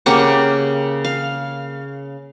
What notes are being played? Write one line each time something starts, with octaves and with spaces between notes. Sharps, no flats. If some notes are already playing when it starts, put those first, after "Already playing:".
C#3 A#3 G4 F#5
F5